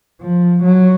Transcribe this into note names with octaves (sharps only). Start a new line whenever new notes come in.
F3
F#3